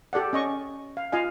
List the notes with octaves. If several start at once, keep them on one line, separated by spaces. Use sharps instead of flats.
G4 A4 D5 F#5
C#4 D#5 C#6
F5
F4 D#5 F5 G#5